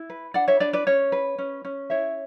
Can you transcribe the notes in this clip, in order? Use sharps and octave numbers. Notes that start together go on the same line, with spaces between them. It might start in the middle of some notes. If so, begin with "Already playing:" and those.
Already playing: E4
B4
D4 D5 F#5
C#5 E5
D4 B4 D5
B4 D5
C#4 C#5
B4
C#4
C#4
E4 C#5 E5